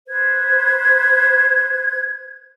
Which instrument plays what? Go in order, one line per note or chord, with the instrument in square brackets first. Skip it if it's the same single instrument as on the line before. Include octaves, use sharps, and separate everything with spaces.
[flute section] B4 C5 G#6